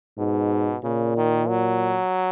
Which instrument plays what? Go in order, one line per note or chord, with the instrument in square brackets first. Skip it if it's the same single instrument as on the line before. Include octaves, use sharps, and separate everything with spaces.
[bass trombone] G#2 [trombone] B2
[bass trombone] A#2 [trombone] C#3
[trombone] D#3
F#3